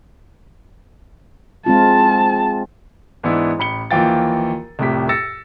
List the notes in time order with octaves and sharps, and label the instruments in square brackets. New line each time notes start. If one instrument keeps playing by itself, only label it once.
[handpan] G#3 C4 F4 [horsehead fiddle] A5
[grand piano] G#2 E3 B3 D4 E4
A1 B5 C#7 G7
D#2 E3 F3 F5 G5 A6
C2 F2 A2 G4 B6
E6 A6 A#6 C#7